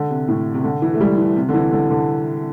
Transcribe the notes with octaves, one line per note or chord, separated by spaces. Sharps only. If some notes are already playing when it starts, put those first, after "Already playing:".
Already playing: D3
C3
A2
C3
D3
E3
A3
G3
E3
C3
D3
E3
D3
D3